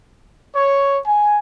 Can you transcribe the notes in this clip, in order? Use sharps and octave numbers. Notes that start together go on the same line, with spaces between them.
C#5
G#5